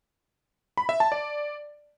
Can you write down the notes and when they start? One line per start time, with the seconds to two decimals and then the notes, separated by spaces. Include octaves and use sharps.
0.77 B5
0.89 E5
1.00 A5
1.12 D5